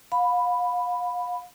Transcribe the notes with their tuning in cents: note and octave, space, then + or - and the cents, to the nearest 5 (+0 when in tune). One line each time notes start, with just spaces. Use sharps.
F5 +35 B5 +0